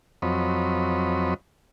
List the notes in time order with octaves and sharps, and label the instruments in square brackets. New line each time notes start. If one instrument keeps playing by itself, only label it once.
[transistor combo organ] F2 F#3 C4 C#5 D#5 B5